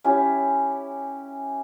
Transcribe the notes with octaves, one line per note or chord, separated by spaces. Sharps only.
C#4 E4 G4